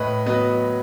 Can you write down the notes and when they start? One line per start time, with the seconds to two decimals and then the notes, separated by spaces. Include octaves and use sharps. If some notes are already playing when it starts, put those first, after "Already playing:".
Already playing: A2 B4 D#5
0.26 F#3 B3 B4 D#5